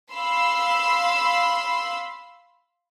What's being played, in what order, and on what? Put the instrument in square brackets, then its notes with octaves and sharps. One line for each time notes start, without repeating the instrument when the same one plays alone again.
[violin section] F5 B5 C6 E6